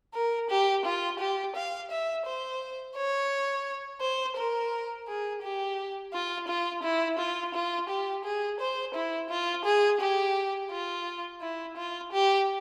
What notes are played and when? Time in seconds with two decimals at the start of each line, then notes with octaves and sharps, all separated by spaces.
0.14 A#4
0.50 G4
0.85 F4
1.20 G4
1.56 F5
1.91 E5
2.26 C5
2.96 C#5
4.01 C5
4.37 A#4
5.08 G#4
5.42 G4
6.13 F4
6.48 F4
6.83 E4
7.19 F4
7.54 F4
7.89 G4
8.24 G#4
8.60 C5
8.94 E4
9.30 F4
9.65 G#4
10.00 G4
10.71 F4
11.41 E4
11.77 F4
12.12 G4